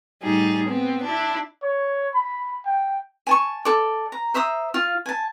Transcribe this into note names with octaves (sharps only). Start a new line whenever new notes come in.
A2 G3 D#4 G#4
B3 C4
D4 E4
C#5
B5
G5
G#5 A5 C#6
A4 D5
A#5
C5 E5 A#5 D#6
F4 F5
G#5 A5